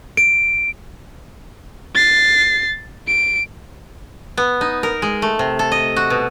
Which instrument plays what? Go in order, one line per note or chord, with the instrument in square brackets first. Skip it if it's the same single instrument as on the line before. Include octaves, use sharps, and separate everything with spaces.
[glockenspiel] D7
[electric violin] A6 C7
D7
[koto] B3
D#4
A#4
G#3
A3
C3
A4
D#5
F#4
B2